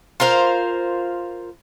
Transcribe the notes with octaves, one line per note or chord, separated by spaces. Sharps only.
F4 A#4 C5 F5